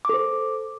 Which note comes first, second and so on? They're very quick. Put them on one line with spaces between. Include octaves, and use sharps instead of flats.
D6 A4 C5